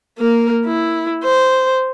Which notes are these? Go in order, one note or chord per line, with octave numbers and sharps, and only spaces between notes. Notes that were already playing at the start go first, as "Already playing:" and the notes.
A#3 A#4
E4
C5